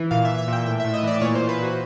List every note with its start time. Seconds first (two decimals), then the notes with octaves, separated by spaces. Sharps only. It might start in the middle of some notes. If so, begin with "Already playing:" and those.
Already playing: E3
0.11 A#2 F5
0.25 E5
0.30 A#2
0.38 E5
0.48 A#2 G5
0.66 A2 G5
0.80 E5
0.84 A2
0.94 D#5
1.03 E3 D5
1.21 A#2 C#5
1.35 C5
1.39 A#2
1.49 B4
1.58 A#2
1.63 F#4